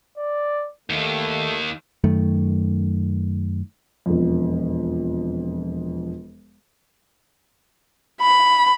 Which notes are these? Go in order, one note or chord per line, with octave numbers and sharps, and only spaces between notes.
D5
D#2 D#3 A3
F#2 D#3 A3
E1 F2
B5